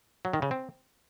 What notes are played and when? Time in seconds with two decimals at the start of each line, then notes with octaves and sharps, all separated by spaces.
0.25 F#3
0.33 D#3
0.42 C#3
0.51 C4